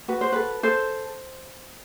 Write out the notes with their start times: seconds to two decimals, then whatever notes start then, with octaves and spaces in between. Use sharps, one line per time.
0.08 F#4 B4
0.21 C5
0.33 A4 B4
0.63 A4 C5